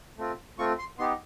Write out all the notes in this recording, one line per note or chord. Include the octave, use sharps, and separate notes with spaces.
A3 C4 F4
A3 C4 F4 C#6
C6
B3 D#4 G4 C6